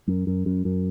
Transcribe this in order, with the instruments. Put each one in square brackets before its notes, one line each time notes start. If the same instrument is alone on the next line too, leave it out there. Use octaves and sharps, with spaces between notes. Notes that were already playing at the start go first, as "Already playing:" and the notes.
[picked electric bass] F#2
F#2
F#2
F#2